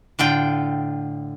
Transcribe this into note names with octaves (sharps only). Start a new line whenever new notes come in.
A2 D3 F4 G5